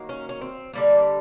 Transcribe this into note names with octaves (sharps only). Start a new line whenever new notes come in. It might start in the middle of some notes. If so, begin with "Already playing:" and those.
Already playing: D#3 F#3 A#3
C#4
C#4
C4
D3 G3 A#3